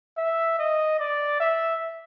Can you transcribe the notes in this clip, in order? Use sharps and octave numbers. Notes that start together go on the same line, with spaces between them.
E5
D#5
D5
E5